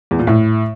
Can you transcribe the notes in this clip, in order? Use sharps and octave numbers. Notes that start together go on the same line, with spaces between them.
E2
A#2
A2